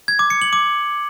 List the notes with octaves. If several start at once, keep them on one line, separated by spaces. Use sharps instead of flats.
G#6
D6
C#7
F#7
D6